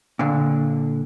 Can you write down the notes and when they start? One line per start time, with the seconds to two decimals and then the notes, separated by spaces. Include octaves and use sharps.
0.19 A#2 D3